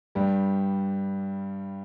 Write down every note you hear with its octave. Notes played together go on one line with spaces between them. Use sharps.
G2 G3